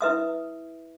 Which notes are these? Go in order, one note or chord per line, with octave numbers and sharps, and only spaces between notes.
E4 B4 E5 D#6